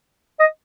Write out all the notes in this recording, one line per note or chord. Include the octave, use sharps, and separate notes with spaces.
D#5